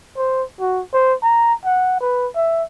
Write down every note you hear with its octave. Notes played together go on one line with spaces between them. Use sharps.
C5
F#4
C5
A#5
F#5
B4
E5